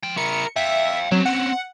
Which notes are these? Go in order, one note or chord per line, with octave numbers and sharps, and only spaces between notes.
F3 G5
E4 A#4 C#7
E5 F5 G5
F#3 C4 C#4
F#5